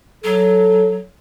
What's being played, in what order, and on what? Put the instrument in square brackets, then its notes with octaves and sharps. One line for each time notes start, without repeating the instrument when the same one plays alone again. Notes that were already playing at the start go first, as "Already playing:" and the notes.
[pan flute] F#3 [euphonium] A4